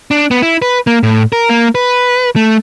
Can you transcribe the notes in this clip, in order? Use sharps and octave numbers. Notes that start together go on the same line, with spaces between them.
D4
B3
E4
B4
A#3
A2
A#4
A#3
B4
A3